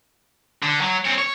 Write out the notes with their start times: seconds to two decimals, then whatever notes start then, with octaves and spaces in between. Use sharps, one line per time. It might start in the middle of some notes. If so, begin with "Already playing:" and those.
0.63 D3
0.81 F#3
1.05 C4 C#5
1.18 C#5